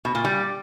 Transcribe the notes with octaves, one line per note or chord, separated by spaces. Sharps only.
B2
A#2
G3